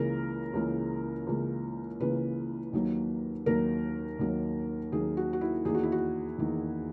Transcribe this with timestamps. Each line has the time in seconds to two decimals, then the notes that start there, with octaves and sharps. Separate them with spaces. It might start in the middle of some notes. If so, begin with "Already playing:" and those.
Already playing: C#2 C#3 E3 A#3 A#4
0.54 C#2 C#3 E3 A#3
1.27 C#2 C#3 E3 A#3
2.00 C#2 C#3 E3 A#3 B4
2.73 D#2 D#3 F#3 A#3
3.46 D#2 D#3 F#3 A#3 A#4
4.19 D#2 D#3 F#3 A#3
4.92 D#2 D#3 F#3 A#3 G#4
5.17 F#4
5.33 F#4
5.41 E4
5.65 E2 D#3 A#3 G#4
5.74 F#4
5.83 E4
5.92 F#4
6.38 E2 D#3 A#3